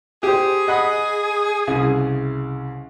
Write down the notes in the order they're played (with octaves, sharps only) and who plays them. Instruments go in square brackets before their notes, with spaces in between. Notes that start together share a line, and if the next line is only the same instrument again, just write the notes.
[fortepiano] G4 C5 [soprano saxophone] G#4
[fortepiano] D#5 F#5 B5
C2 C#3